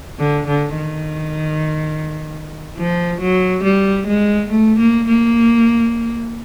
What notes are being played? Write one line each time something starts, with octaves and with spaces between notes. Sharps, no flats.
D3
D3
D#3
F3
F#3
G3
G#3
A3
A#3
A#3